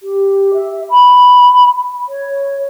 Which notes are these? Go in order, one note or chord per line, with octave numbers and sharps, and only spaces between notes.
G4
E5
B5
C#5